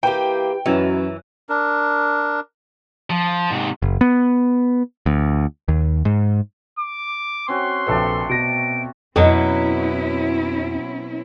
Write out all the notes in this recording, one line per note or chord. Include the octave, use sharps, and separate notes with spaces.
E3 A#3 G4 G5
F#2 B2 E3 F#3
D4 A#4
F3
G#2 C3
F#1
B3
D2
D#2
G#2
D6
C4 C#4 F#4 C6
A#1 C3 A3 A4 B4 D5
B2 A#6 D7
F2 B2 F#3 C4 C#4 E4